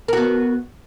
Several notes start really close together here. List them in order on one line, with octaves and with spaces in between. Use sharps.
A#4 F#4 B3